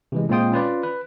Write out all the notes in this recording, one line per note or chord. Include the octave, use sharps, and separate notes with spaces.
C3 E3 G#3
A#2 G#3 C4 F4 G5 D#6
C#4 F4 B4 D5
B4